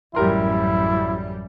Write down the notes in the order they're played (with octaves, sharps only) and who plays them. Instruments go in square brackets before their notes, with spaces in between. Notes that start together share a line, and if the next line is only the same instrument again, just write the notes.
[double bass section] A1 F#2 G3 [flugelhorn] E4 [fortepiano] G4 A#4 C6